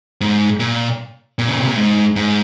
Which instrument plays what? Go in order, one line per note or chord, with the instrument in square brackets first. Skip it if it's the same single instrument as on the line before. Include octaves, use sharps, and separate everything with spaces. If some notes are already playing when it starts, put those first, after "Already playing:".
[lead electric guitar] G#2
A#2
A#2
C#3
C3
A#2
G#2
G#2